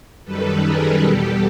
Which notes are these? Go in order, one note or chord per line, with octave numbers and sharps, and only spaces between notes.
F#2 D#3 G3 A4 B4
G#4 A#4
E2 B2 G3 G4 A4